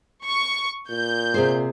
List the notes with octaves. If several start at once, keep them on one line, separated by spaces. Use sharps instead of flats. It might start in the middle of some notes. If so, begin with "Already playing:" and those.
C#6
A#2 G6
C3 G#4 C5